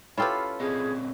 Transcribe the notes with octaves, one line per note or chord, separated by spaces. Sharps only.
C#4 E4 F4 G4 A4 B4 F5
A#2 C4 G#4 D#5